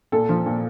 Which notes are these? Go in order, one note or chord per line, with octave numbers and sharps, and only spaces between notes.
A#2 A4
F3
A#2